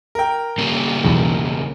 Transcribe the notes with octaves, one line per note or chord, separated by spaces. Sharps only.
A#4 G5
C#3 G3 A#3
B1 E2